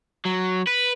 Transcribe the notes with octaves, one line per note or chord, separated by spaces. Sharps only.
F#3
B4